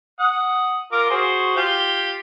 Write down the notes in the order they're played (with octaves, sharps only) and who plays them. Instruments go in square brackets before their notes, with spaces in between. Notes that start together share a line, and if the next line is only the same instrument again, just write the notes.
[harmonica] F#5 D#6
F4 A#4 D6
F#4 G#4 C5
F4 G4 G5